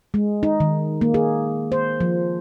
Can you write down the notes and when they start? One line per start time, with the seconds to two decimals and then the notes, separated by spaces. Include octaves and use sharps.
0.14 G#3
0.43 D#4
0.60 D#3
1.01 A#3
1.14 G#4
1.72 C5
2.01 F3